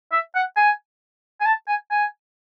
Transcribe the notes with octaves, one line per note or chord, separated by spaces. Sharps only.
E5
F#5
G#5
G#5
A5
G#5
G#5